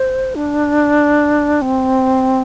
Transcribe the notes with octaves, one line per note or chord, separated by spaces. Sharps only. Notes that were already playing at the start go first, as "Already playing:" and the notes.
Already playing: C5
D4
C4